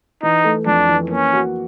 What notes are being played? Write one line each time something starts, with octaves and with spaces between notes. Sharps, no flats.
E3 D#4
A3
F2 D4
E3
A#3 C#4
F#4